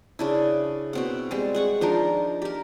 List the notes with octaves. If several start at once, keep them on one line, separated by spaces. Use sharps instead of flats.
C#3 D4 E4
B2 C4 F#5
G3 G#3 C4
G#4 F#5 C#6
F3 D4 D#4 A#4
G4 A#4